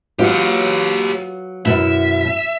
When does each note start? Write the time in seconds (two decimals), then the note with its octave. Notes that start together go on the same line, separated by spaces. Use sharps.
0.19 F#3 B3 F4 G4 C#5
1.66 F#2 B2 E4 E5